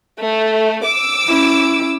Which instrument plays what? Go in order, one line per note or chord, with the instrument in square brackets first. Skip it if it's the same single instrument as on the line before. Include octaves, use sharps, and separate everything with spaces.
[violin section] A3
D6 E6
[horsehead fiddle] C#4 E4